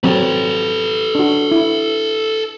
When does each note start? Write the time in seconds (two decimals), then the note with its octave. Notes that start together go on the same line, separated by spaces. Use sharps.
0.04 F#3 C4 A4 B4
1.15 D4 F#4
1.51 E4